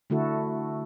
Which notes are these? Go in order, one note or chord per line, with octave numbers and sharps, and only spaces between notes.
D3 A3 E4 F#4 A4